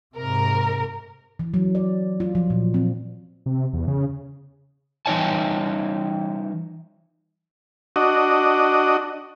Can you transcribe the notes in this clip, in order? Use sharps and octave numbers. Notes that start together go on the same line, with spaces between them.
G#2 C3 A#4
E3
F#3
D5
F4
F3
A#2
C4
C3
E2
C#3
E3 G3 D#4 C#5 G#5 A5
D4 F#4 D#5